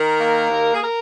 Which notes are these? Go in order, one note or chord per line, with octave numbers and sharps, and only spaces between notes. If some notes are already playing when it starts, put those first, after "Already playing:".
Already playing: D#3 A#4
A#3
D#2
G#4
A#4